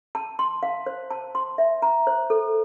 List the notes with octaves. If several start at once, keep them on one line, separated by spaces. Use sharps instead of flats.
A5
C6
F5
C5
A5
C6
E5
A#5
C5
A4